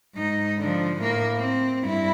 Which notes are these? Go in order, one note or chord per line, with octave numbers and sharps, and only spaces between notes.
G#2 D#4
D3 F3
A2 A#3
C4
G2 E4